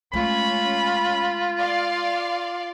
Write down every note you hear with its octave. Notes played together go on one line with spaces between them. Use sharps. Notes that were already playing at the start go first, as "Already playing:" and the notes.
G#3 A3 C#4 F4 B5
D5 F5 C6